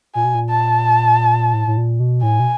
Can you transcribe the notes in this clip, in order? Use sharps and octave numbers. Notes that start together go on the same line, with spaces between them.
A#2 G#5
B2
A#2
A5
A2
A2
A#2
B2
A2 G#5
B2